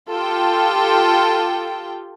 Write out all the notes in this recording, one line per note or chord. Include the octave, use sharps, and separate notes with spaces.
F4 G4 A4 G5